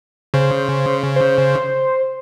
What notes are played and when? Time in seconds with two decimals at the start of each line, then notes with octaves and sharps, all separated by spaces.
0.34 C#3 C5
1.16 C5